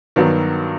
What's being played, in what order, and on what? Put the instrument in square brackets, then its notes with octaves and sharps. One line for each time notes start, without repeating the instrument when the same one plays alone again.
[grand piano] G2 D#3 F#3 B3